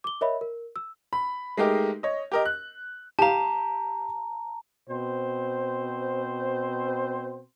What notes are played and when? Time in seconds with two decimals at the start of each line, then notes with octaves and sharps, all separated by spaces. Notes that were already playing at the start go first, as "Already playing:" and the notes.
0.04 D6 G7
0.21 A#4 C#5 D#5 E5 B5
0.41 A#4
0.76 E6
1.13 B5
1.57 G#3 A3 D#4 G4 A#4
2.03 C#5 D#5
2.32 G4 A#4 D#5
2.45 F#6
3.19 G4 F5 A5 A#5
4.89 B2 C4 C5